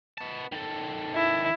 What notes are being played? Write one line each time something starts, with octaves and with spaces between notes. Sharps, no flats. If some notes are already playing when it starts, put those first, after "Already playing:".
B3 A5
D#3 A4
E4